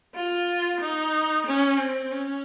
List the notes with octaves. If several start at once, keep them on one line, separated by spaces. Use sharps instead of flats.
F4
D#4
C#4
C4
C#4